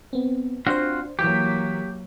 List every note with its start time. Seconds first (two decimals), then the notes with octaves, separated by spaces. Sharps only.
0.13 B3 C4
0.67 C4 D4 F4 F#4 C5
1.19 E3 F#3 A#3 G4 B6